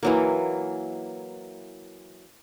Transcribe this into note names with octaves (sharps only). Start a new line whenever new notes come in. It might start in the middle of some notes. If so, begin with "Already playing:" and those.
E3 F#3 A#3